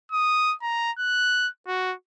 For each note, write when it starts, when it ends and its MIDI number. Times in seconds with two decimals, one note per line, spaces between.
0.12 0.55 87
0.63 0.92 82
0.98 1.49 90
1.68 1.94 66